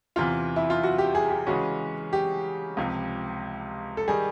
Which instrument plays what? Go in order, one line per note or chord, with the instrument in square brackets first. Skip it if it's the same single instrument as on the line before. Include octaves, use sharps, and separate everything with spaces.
[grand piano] E2 C3 E3 [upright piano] F4
[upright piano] E4
F4
F#4
G4
G#4
G4
[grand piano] C#3 E3 G#3 C#4 [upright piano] F#4
[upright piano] G4
[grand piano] C#2 C3 F3
[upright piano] A4
[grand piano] D#3 G3 [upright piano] G#4